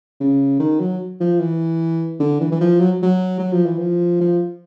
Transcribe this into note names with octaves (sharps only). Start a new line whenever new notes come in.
C#3
D#3
F#3
F3
E3
D3
E3
E3
F3
F#3
F#3
F#3
F3
E3
F3
F3